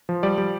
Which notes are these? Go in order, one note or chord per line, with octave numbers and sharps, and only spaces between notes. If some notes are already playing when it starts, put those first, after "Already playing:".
F3
G3 D5
G3